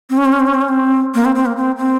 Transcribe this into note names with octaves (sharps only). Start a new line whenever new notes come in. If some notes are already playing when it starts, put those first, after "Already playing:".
C4
C#4
C4
C#4
C4
C#4
C4
C#4
C4
A#3
C4
C4
A#3
C4
C4